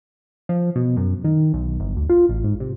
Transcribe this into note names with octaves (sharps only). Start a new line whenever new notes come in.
F3
B2
F#2
D#3
B1
G1
D2
F4
A1
G#2
C3